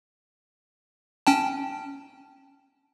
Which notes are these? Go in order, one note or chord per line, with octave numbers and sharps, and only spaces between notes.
C#4 G5 A5